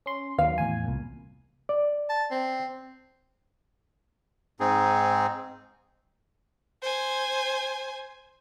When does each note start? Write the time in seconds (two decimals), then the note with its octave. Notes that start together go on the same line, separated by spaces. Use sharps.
0.06 C#4 C6
0.38 D#2 F#3 F5
0.58 E2 A2 G#5
0.85 C2 A#2
1.69 D5
2.09 A5
2.31 C4
4.60 G#2 C4 D#4 G#4
6.82 C5 G#5